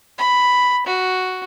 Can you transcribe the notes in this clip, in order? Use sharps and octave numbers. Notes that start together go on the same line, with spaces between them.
B5
F#4